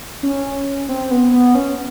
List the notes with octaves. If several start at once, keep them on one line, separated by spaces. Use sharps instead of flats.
C#4
C4
B3
B3
C#4